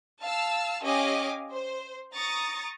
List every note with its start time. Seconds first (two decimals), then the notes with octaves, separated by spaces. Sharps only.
0.22 F5 A5 E6
0.82 C#4 G4 D#5 F5 G#5 D6
1.52 C5
2.14 A#5 C#6 D#6 A6